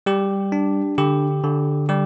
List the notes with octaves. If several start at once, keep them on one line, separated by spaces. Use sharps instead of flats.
G3 G4
D4
D3 G4
D3
G3 G4